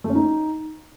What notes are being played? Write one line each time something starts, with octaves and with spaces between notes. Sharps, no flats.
A3
C#4
D#4